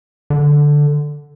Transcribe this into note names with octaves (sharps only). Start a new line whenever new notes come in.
D3